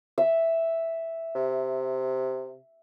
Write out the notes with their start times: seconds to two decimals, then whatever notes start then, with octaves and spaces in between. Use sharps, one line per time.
0.18 E5
1.35 C3